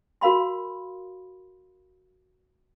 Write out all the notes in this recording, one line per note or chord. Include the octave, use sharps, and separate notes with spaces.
F#4 A#4 F5 B5 C6